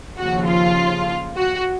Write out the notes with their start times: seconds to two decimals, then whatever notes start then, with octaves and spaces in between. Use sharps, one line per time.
0.17 D#2 C#3 F3 F#4
0.48 F4
1.37 F#4